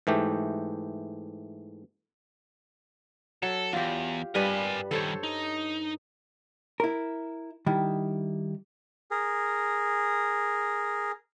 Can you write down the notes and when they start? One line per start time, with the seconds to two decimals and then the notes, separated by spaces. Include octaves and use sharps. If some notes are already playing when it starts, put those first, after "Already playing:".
0.07 G#2 E3 A3 G4
3.42 F#3 A4
3.73 E2 F4 G4
4.35 G2 G3 A#4 B4 G#5
4.91 D#3 G3 A4 C5 C#5
5.23 D#4
6.80 E4 A#4
7.66 D#3 G3 E4
9.11 G#4 A#4